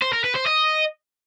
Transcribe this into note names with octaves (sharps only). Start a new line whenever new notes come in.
C5
A#4
B4
C5
D#5